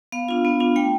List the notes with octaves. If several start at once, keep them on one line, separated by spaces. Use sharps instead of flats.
B3 F5
D4 F4
B3
D4 F4
A3 G5